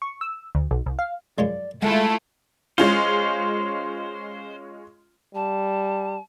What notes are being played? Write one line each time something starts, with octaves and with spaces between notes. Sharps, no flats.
C#6
E6
D2
B1
C2
F5
F#2 F3 G#3 D5
G#3 A3 E4 F4 A4 F#5
G#3 C#4 F4 C5
G3 A5